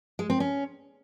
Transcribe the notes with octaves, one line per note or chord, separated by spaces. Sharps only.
G#3
C4
C#4